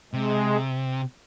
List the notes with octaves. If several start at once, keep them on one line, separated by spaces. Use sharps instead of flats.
C3 G#3